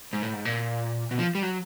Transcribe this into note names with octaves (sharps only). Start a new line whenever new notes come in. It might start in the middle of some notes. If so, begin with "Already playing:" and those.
G#2
A2
G#2
A#2
B2
F3
G3
F#3